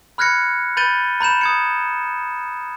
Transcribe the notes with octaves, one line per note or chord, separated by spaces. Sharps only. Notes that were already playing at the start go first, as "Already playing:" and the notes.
B5 F6 F#6 G#6 A#6 C#7
B5 G6 A6 D#7 G7
A#5 B5 G6 E7
D#6 G#6 C#7